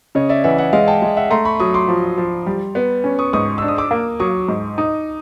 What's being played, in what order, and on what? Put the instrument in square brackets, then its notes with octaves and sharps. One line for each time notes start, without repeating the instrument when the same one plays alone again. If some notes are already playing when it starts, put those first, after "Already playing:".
[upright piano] C#3 [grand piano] C#5 D#5
[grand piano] D5 E5
[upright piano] E3 [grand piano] E5 F#5
[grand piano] E5 F#5
[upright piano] G#3 [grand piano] D#5 F5
[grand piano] G5 A5
[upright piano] G#3
[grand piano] E5 F#5
[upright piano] A3 [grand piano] A#5 C6
[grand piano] B5 C#6
[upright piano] F#3 [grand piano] C#6 D#6
[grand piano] C6 D6
[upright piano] F3
F3
G3
B3
C#4
[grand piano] C#6 D#6
[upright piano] G#2 [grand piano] C#6 D#6
[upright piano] D4 [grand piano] E6
[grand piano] D#6
D6 E6
[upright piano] A#3
[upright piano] F#3 [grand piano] C#6 D#6
[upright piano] G#2
D#4